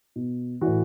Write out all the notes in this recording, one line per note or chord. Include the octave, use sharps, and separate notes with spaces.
B2
A2 E3 F#4